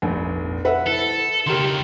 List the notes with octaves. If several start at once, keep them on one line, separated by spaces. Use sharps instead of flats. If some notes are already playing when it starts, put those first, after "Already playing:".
F1 A#1
B4 E5 F#5
E4 A4
C#2 D#3 G4 A#4 C6